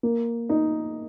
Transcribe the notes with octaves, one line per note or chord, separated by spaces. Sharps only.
A#3
D#4